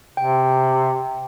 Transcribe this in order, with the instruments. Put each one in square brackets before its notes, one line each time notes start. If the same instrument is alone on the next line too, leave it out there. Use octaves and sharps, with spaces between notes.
[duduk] C3 [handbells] G5